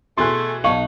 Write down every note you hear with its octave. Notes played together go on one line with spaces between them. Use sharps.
B2 E3 A3 G#4 C6 F#6
B1 D#4 F5 C#6 F#7